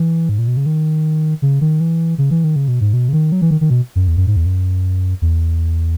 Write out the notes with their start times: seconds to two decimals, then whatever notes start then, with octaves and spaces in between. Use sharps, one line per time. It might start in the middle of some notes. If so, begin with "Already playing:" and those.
Already playing: E3
0.29 G#2
0.39 A#2
0.48 B2
0.57 C#3
0.66 D#3
1.42 C#3
1.61 D#3
1.80 E3
2.18 C#3
2.31 E3
2.44 D#3
2.56 C#3
2.68 B2
2.81 G#2
2.93 B2
3.09 C#3
3.13 D#3
3.32 F#3
3.42 E3
3.51 D#3
3.61 D#3
3.70 B2
3.96 F#2
4.08 E2
4.17 F#2
4.27 G#2
4.36 E2
4.46 F#2
5.22 E2